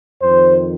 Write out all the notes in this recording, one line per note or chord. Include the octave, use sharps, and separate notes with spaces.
F2 C5
D#3